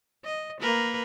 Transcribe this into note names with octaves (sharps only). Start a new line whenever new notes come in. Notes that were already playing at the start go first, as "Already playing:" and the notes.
D#5
A#3 A#4 B4